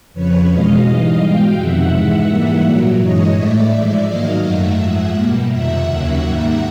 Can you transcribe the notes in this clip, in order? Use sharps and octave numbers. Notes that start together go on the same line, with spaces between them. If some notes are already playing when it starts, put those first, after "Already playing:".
F2 C#3 F3 B4 C#5
E2 B2 G#3 D#5 F5
G#2 E3 G3 D#5 F5
B2 G#3 F5 G5
F2 C3 D#3 E5 F#5
G#2 E3 G#3
G#2 E3 G3 A#3 E5 F#5
A#2 F#3 A#3
G2 E3 G#3 C#5 D#5
A2 E3 A3 D5 E5
G#2 F3 G#3
G#2 D#3 F#3 A#3 D#5 F5
F#2 D#3 F#3 A3 E5 F#5
G#2 F3 G#3
B2 G3 A#3
F2 C3 D#3 E5 F#5
D#2 C#3 F#3 A#3
G#2 D#3 G3 A#3